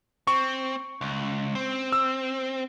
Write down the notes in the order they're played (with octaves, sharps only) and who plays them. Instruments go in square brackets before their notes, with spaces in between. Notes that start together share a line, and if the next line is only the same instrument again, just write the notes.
[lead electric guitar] C4 [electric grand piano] C#6
[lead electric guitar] C#2
C4
[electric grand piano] E6